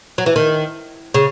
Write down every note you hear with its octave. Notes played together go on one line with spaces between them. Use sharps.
F#3
E3
D#3
C#3